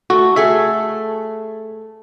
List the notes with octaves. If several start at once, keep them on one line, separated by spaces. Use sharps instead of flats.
A3 F#4
A3 G#4 A4 E5